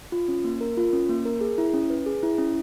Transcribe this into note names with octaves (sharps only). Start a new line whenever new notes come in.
F4
C#4
A#3
A#4
F4
C#4
A#3
A#4
G#4
E4
C#4
B4
G#4
E4
C#4